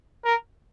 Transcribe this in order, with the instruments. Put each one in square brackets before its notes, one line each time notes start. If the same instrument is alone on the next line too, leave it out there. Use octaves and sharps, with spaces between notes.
[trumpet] A#4